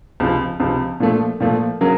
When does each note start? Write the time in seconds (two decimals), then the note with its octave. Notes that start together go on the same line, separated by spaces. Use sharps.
0.20 C#2 C3 F3
0.60 C#2 C3 F3
1.00 A#2 F3 A3
1.40 A#2 F3 A3
1.81 C#3 F#3 A#3